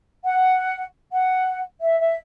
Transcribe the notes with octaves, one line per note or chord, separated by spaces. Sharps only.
F#5
F#5
E5
E5